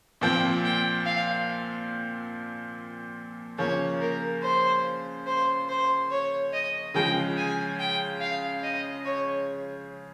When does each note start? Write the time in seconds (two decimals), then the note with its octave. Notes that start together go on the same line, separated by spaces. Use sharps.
0.21 A#2 F3 C4 G5
0.64 G5
1.05 F5
3.58 C#3 F3 A#3 C#5
4.01 A#4
4.42 C5
5.26 C5
5.69 C5
6.11 C#5
6.53 D#5
6.94 C#3 F3 G#3 G5
7.36 G#5
7.79 G5
8.21 F5
8.63 D#5
9.05 C#5